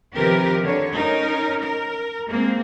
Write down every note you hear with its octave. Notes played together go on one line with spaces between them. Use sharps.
C3 D#3 F3 G4 A#4 B4
D3 C#5
C#4 D#4 A#4
A#4
G#3 A#3 C4